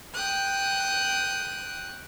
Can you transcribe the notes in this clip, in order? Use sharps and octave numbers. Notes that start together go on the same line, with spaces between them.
G5 D#6 F#6